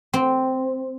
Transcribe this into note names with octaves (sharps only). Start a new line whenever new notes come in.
C4